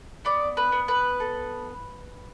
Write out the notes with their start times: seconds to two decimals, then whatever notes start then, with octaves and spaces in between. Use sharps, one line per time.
0.25 B3 D5
0.57 B4
0.72 B3
0.88 B4
1.20 A4